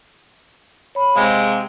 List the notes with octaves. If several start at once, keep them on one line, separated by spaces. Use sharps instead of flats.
C#5 B5
C3 G#3 F5